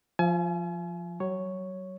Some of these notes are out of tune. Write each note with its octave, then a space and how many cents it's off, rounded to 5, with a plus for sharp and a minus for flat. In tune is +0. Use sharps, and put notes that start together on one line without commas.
F3 +0 F5 -45 G#5 +35
F#3 +35 C#5 +0